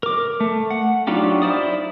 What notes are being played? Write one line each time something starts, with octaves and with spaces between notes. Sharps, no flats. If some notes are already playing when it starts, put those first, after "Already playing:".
A#4 D6
A3
F#5
F#3 D4 D#4 F4 G4
E4 C5 D5 D#6